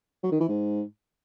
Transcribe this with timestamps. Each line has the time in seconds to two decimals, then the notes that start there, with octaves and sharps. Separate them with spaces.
0.23 F#3
0.32 D#3
0.40 E3
0.49 G#2